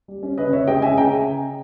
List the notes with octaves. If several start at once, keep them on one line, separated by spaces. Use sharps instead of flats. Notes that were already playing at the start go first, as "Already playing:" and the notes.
G3
C#4
C#3 B4 D#5
C#3 C#5 E5
G#3 D#5 G5
C#4 E5 G#5
C#3 G5 A#5